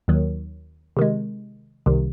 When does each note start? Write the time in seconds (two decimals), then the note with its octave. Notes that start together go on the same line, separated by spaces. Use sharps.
0.08 D#2 D#3 F#3
0.97 C3 D#3 G#3
1.86 C2 C3 D#3